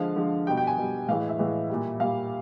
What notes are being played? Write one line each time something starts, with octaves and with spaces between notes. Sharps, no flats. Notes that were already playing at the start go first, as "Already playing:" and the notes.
Already playing: D3 F3 G#3 F5
D3 F3 G#3
B2 G3 G5
G5
G#5
B2 G3
A2 E3 G#3 F5
E5
A2 E3 G#3
A#2 G3
A#2 G3 F5